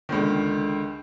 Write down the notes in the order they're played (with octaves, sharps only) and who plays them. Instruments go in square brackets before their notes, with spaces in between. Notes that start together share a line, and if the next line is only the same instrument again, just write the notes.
[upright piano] C#2 D3 D#3